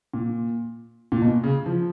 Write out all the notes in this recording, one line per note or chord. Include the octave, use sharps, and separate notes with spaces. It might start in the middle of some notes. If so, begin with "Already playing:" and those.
A#2
A#2
B2
C#3
F3